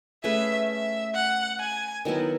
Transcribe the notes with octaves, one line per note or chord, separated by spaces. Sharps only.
A3 C#4 G#4 B4 E5
E5
F#5
G#5
D#3 F#3 B3 E4